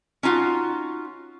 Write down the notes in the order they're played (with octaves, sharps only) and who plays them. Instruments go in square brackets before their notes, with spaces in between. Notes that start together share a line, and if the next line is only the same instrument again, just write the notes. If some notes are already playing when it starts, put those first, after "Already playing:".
[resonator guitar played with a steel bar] C#4 D#4 F4 F#4